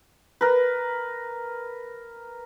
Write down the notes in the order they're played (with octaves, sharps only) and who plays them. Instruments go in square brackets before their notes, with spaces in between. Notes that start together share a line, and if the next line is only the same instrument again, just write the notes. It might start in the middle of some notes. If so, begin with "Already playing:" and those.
[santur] A#4 B4